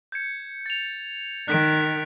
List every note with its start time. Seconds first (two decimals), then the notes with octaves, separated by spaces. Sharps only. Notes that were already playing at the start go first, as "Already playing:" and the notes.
0.12 G6 G#6 C#7
0.66 A6 F7
1.48 D#3 F#6 B6 D7